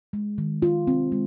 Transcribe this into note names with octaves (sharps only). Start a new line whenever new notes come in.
G#3
D#3
F4
C4
G#3